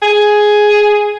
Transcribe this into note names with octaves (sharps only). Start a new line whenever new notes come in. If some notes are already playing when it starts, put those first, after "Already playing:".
G#4